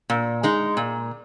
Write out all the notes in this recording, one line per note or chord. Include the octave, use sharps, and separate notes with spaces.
A#2
G#3 D#4
A#2